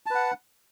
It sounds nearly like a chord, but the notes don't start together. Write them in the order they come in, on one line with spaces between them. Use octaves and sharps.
A5 B4 F#5